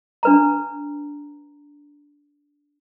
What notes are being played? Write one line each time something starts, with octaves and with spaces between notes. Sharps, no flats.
D4 B4 A#5